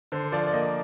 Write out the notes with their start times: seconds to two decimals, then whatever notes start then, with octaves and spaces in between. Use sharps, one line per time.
0.12 D3 C5
0.32 F3 D5
0.47 D5
0.52 A#3 D#5